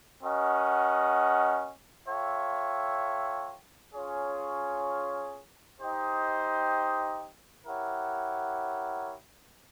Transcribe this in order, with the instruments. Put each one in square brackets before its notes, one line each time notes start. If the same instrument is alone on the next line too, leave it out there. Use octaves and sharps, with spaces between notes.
[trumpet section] C#4 F#4 A#4 D#5 F#5
F4 A4 C#5 E5 G5
C#4 F4 G#4 C#5
D#4 G4 C5 D#5 G5
E4 G4 A#4 C#5 F#5